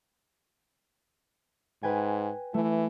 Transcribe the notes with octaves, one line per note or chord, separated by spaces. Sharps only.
G#2 B4 G5 G#5
E3 A3